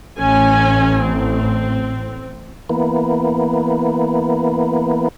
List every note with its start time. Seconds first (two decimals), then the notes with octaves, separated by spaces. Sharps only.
0.20 A1 C#4 G#5
1.05 C4
2.69 E3 A#3 B3